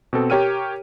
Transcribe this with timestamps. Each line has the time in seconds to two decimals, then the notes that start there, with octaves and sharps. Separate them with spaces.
0.13 B2 C4 A4
0.30 G4 A#4 C#5 G5 F6 D#7